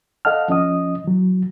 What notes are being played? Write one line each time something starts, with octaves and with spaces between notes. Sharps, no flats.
A4 D#5 F5 F#5 A5 F6
F3 C#4 D#5 D#6
E3 F#3